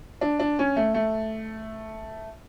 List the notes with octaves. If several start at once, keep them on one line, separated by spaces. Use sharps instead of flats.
D4
D4
C#4
A3
A3